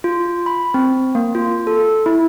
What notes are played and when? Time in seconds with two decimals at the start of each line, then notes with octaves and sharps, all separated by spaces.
0.04 F4
0.46 B5
0.74 C4
1.15 A#3
1.35 F4
1.67 A4
2.06 E4